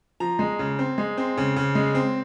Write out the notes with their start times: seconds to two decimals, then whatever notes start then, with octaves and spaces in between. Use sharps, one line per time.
0.20 F3 A#5
0.39 G#3
0.59 C#3
0.79 C4
0.98 G#3
1.18 C4
1.37 C#3
1.56 C#3
1.75 G#3
1.95 C4